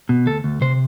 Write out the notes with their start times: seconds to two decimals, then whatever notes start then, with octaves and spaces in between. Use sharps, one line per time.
0.09 B2
0.26 D2 A4
0.44 D2
0.61 C3 C5